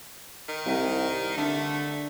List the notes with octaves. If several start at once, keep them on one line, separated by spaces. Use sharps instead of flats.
D#3
C2
D3 A3